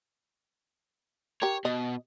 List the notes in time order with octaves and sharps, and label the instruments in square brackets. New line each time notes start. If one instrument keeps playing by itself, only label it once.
[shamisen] G4 A#4 [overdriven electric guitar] C#5
[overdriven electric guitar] B2 [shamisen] D#5